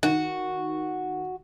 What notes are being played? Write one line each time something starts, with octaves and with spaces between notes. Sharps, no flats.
D#3 F#4